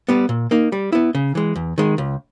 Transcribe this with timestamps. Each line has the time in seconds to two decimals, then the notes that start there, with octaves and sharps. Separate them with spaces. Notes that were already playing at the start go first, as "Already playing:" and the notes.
0.09 G3 B3
0.29 A#2
0.51 A#3 D#4
0.72 G3
0.92 B3 E4
1.15 C#3
1.35 E3 G#3
1.56 E2
1.78 D#3 G#3
1.98 C#2